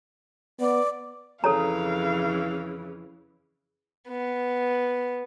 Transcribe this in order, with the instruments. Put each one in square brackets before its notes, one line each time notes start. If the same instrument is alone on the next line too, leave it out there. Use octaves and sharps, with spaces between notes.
[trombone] B3 [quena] D5
[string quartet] F2 C#3 E3 [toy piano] A4 C#5 A#5 [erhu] F5
[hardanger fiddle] B3